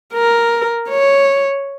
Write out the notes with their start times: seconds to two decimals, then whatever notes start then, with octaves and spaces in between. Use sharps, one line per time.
0.14 A#4
0.89 C#5